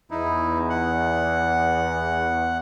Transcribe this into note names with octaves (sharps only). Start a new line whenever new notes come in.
E2 D#4 E4
F#5